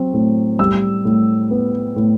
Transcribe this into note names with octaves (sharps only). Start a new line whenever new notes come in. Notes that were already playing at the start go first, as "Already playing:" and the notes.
Already playing: F#3 C4
A2
G3 E6
A2
B3
A2